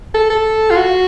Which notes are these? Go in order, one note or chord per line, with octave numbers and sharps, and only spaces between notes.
A4
A4
F4
F#4